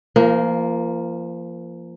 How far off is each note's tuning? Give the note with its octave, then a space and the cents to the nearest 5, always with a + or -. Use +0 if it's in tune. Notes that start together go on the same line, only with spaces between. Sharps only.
F3 -30 A#3 +0